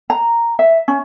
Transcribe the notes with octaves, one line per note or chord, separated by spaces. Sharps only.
A#5
E5
C#4